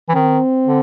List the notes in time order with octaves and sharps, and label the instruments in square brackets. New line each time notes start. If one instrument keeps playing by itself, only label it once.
[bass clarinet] E3
[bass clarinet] D#3 [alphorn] C4
[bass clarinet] D3